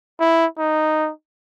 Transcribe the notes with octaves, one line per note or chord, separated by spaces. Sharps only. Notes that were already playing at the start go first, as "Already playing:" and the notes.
E4
D#4